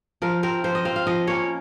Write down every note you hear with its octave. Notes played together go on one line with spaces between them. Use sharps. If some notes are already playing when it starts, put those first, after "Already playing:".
F3 A#4
C4 A#4
F3 C5
D#5
C4 F5
F5
F3 D#5
A#3 C#4 C#5